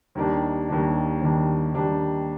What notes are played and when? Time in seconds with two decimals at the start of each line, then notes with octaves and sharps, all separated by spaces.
0.15 D#2 D#3 G3 D4
0.68 D#2 D#3 G3 D4
1.21 D#2 D#3 G3 D4
1.74 D#2 D#3 G3 D4